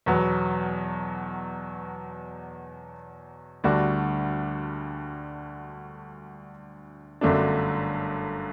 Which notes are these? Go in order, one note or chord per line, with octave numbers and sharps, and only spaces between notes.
E2 B2 F#3 B3
D2 D3 G3 D4 F#4
G1 F#2 D3 A3 D4